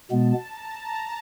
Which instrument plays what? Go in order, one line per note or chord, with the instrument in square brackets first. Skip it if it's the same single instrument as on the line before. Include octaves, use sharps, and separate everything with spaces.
[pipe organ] B2 G#3 B3 [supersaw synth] A5
[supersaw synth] A#5